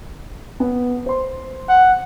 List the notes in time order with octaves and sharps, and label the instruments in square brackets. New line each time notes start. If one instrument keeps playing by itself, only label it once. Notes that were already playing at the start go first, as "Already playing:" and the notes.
[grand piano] B3
C5 C6
[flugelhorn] F#5